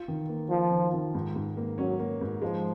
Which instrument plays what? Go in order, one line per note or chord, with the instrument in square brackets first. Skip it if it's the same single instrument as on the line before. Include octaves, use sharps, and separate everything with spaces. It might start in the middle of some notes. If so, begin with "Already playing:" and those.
Already playing: [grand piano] F4
D#3
A#3
[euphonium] F3 [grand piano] F4
[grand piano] D#3
D#3
G#2
G#2
A#3
[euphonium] F#3 [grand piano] C#4
[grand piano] A#3
G#2
[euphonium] F3 [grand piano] G#3